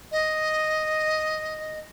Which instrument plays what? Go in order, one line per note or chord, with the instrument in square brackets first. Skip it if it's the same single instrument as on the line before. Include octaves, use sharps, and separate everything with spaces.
[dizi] D#5